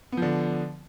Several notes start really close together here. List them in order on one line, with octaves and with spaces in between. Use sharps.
B3 F3 D3